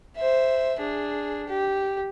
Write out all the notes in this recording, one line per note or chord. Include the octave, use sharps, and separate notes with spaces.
C5 E5
D4 G#4
G4